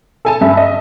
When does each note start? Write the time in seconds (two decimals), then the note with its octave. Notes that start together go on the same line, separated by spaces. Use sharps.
0.25 A4 G#5 A5
0.41 G2 E5 A5
0.57 D#5